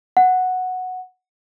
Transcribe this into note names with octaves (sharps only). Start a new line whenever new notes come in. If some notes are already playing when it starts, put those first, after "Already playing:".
F#5